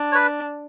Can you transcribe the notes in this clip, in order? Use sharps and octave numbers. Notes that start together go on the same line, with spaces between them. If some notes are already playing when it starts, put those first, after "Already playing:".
Already playing: D4
C#5
B4